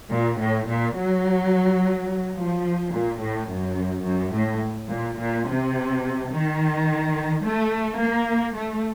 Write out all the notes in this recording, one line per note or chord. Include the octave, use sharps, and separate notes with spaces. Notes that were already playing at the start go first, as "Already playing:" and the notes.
A#2
A2
A#2
F#3
F3
A#2
A2
F#2
F#2
A2
A#2
A#2
C3
D#3
A3
A#3
A3